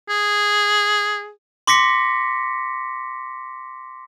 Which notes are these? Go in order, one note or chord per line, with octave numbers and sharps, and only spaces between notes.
G#4
C6 D6 A#6 B6 C#7